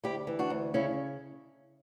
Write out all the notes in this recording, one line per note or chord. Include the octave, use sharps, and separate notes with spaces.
D2 E4 G4
E3
D4 F#4
D2
C#3 C#4 E4